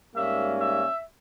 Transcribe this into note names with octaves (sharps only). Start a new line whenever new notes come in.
G#2 G3 A#3 C#4 E5
E5